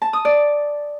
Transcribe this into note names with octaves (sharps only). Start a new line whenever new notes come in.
A5
D#6
D5